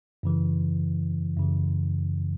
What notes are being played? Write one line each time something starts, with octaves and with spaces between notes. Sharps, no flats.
F#2 C#3 E3
F#2 C#3 E3